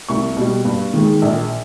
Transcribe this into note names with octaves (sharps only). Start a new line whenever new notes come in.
C2 C#6
B2 G3
G2
D#3 G#3
A#1